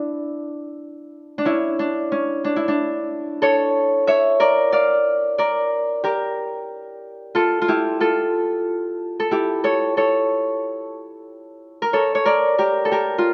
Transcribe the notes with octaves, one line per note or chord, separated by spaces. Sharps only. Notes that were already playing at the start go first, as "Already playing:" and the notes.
Already playing: D4 E4
D4
C#4 E4
D4
C#4
D4
E4
D4
A4 C#5
C#5 E5
A#4 D5
D5 F5
A#4 D5
G4 A#4
F4 A4
F4
E4 G4
F4 A4
A4
E4 G4
A4 C#5
A4 C#5
A#4
A4 C#5
C#5
A#4 D5
G4 A#4
A4
G4 A#4
F4